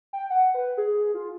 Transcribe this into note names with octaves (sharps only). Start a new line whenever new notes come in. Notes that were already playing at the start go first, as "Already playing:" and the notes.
G5
F#5
B4
G#4
F4